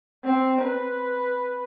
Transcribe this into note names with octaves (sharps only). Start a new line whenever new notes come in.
C4
B4